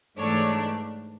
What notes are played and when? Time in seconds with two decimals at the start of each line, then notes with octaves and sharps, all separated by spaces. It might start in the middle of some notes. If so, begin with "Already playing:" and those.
0.17 G#2 E3 A3 D4 C#5